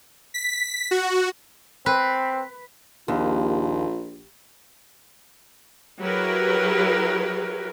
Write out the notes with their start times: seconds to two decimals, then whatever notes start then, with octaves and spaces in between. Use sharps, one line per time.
0.34 B6
0.91 F#4
1.86 C4 B4
3.08 A#1 D#2 F4
6.01 F#3 E4 G4 G#4 A#4 B4